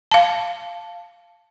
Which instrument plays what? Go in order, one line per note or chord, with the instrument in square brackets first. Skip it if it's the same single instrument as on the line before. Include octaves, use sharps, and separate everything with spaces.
[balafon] F5 A5